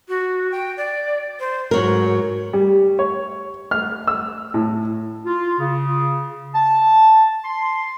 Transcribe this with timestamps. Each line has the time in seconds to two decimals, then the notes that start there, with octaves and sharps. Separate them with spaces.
0.08 F#4
0.51 G5
0.77 D5
1.39 C5
1.71 G#2 F#3 A#4 C#5
2.53 G3
2.99 C#5
3.71 F6
4.07 E6
4.54 A2
5.25 F4
5.59 C#3
6.54 A5
7.43 C6